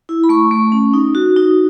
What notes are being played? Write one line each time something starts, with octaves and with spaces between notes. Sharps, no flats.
E4
B5
A3 C#6
A3
C#4
D#4
F#4
D#4